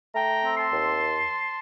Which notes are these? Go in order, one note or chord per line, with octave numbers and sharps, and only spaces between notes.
A3 G5 A#5
C4
A5 C6
D#2